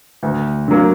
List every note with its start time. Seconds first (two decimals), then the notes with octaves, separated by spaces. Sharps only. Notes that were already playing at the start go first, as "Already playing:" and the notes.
0.23 D2
0.68 D3 F#3 A#3